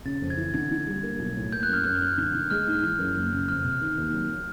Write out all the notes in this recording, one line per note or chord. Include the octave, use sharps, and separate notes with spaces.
C#3 A6
F2
G#6
E3
D3 G#6
D3
G3
A#3
B1
A2
A#3 G6
F#6
F#2 F6
F#2 F#6
F#3
D3
D3
G#3 F6
G#2
E3
F#2
F#1
C#3
F2 F6
C3
D#3
D#2
F#3
F#3